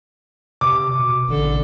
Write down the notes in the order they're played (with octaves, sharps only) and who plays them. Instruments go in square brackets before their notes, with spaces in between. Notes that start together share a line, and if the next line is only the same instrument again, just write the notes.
[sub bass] C3 [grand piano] D6
[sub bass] B2
[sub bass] A1 [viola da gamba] D3 A4